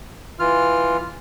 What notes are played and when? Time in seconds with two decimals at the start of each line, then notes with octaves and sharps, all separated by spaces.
0.39 E3 F4 F6